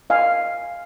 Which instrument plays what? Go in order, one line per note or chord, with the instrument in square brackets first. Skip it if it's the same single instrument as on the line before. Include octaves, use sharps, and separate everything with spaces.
[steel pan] D#5 F5 G#5